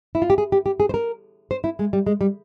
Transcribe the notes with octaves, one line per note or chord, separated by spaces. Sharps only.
E4
F4
G4
G#4
G4
G4
G#4
C5
A#4
C5
E4
G#3
G3
G#3
G3